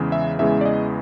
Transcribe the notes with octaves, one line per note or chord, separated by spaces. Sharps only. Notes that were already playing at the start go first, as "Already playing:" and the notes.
Already playing: E2 C#3 E3 G#3
E5
E2 C#3 E3 G#3 E5
D5
D#5